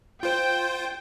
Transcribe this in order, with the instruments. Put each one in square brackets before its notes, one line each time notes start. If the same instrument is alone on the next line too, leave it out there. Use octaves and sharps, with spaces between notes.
[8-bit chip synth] F4 C5 [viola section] G5